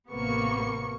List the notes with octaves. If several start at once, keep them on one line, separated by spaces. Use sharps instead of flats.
A1 C3 A#3 B3 C#6 C#7